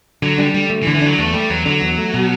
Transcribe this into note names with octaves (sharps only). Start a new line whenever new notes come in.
D3 F#3
G3 D4
D3 G3
A3
E3
D3
E3
F#3 D4
E2 A3
G3 A3
E2 F#3
D3 F#3
E2
A3
B2